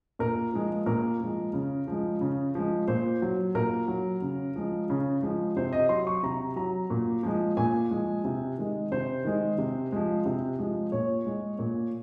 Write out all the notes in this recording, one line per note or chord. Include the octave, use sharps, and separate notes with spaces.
A#2 A#4
F3 G#3
A#2 A#4
F3 G#3
C#3
F3 G#3
C#3
F3 G#3
A#2 C5
F#3
A#2 A#4
F#3
C#3
F3 G#3
C#3
F3 G#3
C3 C5
D#5
F#3 C6
C#6
C3 A#5
F#3 A#5
A#2
F3 G#3
A#2 G#5
F3 G#3
C3
D#3 G#3
C3 C5
D#3 G#3
C3
F3 G#3
C3
F3 G#3
A#2 C#5
G#3
A#2